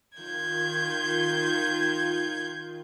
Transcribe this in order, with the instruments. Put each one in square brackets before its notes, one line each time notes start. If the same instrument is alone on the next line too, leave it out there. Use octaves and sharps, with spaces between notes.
[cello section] D#3 F4 [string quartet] G6 G#6